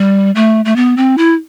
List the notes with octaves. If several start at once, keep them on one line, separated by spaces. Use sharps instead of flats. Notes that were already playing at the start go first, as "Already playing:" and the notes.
Already playing: G3
A3
A3
B3
C4
E4